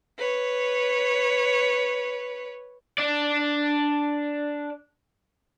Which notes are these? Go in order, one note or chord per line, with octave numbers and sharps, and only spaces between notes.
B4 C#5
D4 D5